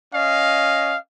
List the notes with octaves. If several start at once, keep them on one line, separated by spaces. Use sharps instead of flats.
C#4 D#5 F5